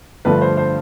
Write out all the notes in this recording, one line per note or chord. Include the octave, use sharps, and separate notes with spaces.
G2 D3 F3 A3 B4
C5
C5